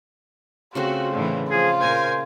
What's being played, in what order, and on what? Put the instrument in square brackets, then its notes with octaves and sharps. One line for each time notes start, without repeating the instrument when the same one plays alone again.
[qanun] C#3 A3 C4 [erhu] F4 [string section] F#4
[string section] A2 D3 E3
[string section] F3 [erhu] F4 [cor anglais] G#4
[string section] A#2 A#4 G#5 [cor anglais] C5